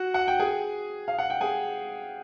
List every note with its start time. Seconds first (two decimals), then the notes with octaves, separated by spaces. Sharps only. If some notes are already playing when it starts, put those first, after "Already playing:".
Already playing: F#4 F#5
0.14 F#5
0.28 G5
0.39 G#4 G#5
1.08 F5
1.18 F#5
1.30 G5
1.41 G#4 G#5